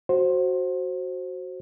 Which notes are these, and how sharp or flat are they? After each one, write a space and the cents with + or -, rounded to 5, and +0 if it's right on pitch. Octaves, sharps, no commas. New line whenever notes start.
F#4 +0 C5 +15